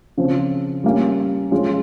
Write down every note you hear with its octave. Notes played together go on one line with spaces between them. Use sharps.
C#3 F3 C4
G3 A#3 C#4
F3 G#3 C#4 F4